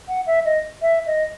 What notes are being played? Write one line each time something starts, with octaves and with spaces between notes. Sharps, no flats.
F#5
E5
D#5
E5
D#5